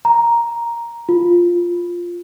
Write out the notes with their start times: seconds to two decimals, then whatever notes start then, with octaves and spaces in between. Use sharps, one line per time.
0.05 A#5
1.09 F4